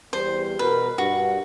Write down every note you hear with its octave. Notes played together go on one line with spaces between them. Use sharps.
E2 G3 C5
B2 A#4 B4
G2 F#4